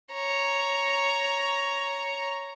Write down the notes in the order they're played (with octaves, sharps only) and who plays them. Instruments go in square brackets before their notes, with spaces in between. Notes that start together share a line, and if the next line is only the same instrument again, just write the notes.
[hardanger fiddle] C#5 A#5